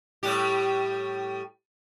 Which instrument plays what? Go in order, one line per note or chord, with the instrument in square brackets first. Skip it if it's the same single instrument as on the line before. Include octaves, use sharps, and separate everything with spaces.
[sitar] A2 G3 G4